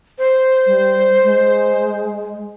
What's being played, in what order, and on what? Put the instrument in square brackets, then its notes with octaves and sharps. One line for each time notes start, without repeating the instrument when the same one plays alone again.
[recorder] C5
[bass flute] G3
G#3